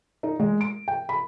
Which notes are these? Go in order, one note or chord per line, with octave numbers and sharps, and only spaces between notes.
D#4
G#3
D7
G5
B5